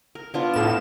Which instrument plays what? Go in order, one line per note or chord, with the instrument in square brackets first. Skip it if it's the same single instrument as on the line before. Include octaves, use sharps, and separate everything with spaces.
[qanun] A#4
B3 D4 F4
[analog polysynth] A2 E7